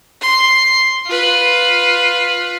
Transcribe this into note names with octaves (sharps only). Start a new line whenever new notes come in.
C6
F4 B4